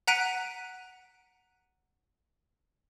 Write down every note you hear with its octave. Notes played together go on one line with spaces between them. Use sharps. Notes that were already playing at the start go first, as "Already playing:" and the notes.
F#5 A#5 F#6 B6 D7 D#7